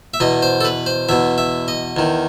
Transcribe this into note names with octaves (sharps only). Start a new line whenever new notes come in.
E5
E2 B2 D#5
C5
A4
B4
C5
E2 B2 E5
E5
D#5
E2 D#3